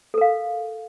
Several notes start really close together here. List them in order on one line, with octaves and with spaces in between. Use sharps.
A4 A#4 F5